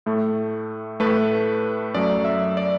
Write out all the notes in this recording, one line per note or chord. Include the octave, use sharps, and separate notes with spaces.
A2 A3
A2 A3 B4
F#2 F#3 A3 D5
E5
D5